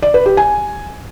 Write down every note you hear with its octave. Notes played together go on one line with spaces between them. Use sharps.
D5
B4
G4
G#5